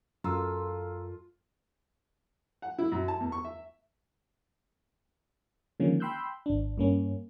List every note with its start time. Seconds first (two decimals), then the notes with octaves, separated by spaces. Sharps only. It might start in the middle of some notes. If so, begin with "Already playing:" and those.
0.24 F#2 F4 A4 A#5 E6
2.62 F#5
2.78 E4
2.92 F#2
3.08 A5
3.20 E2
3.32 C#6
3.45 E5
5.80 D3 D#3 F3 G#3 A#3 C#4
6.00 G5 B5 C6 E6 F#6 G6
6.46 G#1 D4
6.78 G2 A#3 C#4